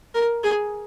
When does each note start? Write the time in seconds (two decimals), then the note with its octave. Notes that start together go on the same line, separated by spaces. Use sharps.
0.15 A#4
0.44 G#4